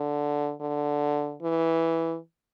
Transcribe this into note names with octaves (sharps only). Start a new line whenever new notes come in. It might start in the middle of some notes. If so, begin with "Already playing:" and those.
Already playing: D3
D3
E3